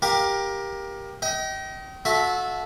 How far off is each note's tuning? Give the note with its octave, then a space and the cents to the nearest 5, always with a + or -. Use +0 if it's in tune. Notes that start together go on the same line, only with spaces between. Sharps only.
G4 +10 A#4 +15 F5 +25
D#5 +25 G5 -30
F#4 -30 A4 -20 E5 +0